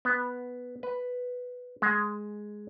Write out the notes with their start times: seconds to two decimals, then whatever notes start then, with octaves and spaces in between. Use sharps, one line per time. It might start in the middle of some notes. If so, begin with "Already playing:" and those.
0.05 B3
0.83 B4
1.82 G#3